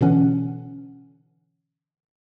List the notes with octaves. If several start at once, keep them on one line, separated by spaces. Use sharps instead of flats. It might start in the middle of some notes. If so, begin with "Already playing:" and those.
B2 D3 E3 C#4 F#5